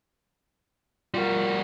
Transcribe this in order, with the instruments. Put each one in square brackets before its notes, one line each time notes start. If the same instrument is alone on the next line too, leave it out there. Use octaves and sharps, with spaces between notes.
[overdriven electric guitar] G3 F#4 [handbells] F4 A#4